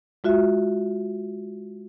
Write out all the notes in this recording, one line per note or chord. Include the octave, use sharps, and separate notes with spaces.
G#3 F4 F#4 E5